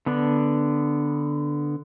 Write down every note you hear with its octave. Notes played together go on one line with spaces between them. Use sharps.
D3 B3 D4